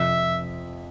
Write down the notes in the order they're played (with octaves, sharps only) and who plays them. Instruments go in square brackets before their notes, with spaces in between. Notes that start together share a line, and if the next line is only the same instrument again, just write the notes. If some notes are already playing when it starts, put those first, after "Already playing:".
Already playing: [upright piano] F2 C3 F3 [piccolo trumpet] E5